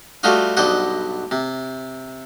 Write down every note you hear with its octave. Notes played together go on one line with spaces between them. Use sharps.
G3 A3 F4 F#4 D#5 F5
B1 G2 C5 D5 D#5 F#5
C3